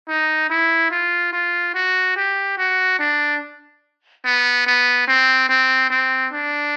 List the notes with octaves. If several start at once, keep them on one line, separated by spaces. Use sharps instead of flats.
D#4
E4
F4
F4
F#4
G4
F#4
D4
B3
B3
C4
C4
C4
D4